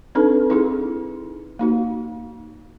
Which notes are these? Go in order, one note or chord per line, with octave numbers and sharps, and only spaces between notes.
C4 D4 D#4 A4 B4
D#4 E4 G#4
A#3 D#4 F#4